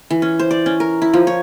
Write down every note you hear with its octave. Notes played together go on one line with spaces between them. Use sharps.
E3
C#4
C5
D5
C#4
A#4
E4
F3
C#5